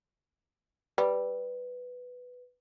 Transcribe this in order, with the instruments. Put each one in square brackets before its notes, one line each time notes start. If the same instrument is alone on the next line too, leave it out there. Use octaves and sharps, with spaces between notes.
[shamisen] G3 [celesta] B4